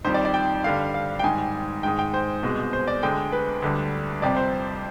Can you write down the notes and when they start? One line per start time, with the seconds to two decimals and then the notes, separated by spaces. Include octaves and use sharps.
0.04 F2 D#3 G3 C5
0.14 D5
0.25 D5
0.34 G5
0.64 G2 D3 G3 F5
0.94 F5
1.19 G5
1.24 G#2 D#3 G3 G#5
1.83 G#2 D#3 G#3 G5
1.99 G5
2.14 C5
2.43 C2 B2 G#3
2.73 C5
2.88 D5
3.03 D2 D3 G#3 G5
3.32 B4
3.62 D2 D3 G3
4.22 F2 C3 G3 D5
4.37 C5